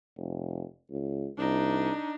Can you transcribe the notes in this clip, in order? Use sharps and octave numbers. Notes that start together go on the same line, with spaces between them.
F1
C#2
C2 D4 D#4